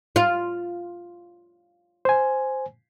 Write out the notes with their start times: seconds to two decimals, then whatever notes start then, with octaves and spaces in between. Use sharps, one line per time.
0.16 F4
2.05 C5 G#5